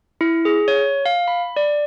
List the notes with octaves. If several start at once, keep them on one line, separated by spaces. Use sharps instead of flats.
E4
G#4
C#5
F5
B5
D5